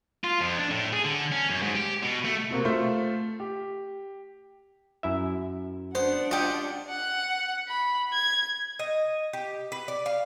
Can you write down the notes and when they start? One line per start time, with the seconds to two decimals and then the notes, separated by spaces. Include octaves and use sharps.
0.24 F4
0.41 F2
0.58 D4
0.71 A2
0.93 G#4
1.04 D3
1.32 C#4
1.49 F#2
1.63 G#2
1.75 G4
2.03 B2
2.25 A3
2.51 C3 A#3 C4 F#4
2.65 A3 F4 C5 E5
3.40 G4
5.03 F#2 E4 E5
5.95 B3 D4 C5 F#5
6.31 F4 G4 D#5
6.89 F#5
7.68 B5
8.13 G#6
8.79 D#5
9.33 G4
9.72 B4
9.88 D5
10.06 F5